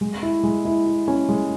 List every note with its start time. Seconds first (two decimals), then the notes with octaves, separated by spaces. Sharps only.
0.01 G#3
0.23 E4
0.43 G#3
0.65 E4
0.86 E4
1.08 C#4
1.29 G#3